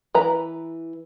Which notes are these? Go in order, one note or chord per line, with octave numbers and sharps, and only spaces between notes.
E3 B4 A#5